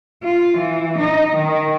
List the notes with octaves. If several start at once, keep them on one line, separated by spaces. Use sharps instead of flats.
F4
E3
D#4
D#3